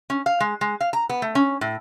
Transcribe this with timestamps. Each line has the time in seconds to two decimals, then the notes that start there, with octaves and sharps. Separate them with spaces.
0.10 C#4
0.26 F5
0.40 G#3
0.61 G#3
0.81 F5
0.93 A#5
1.09 B3
1.22 A3
1.35 C#4
1.61 A2